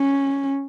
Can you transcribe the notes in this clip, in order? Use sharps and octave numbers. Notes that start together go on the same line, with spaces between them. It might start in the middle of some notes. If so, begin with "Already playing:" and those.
Already playing: C#4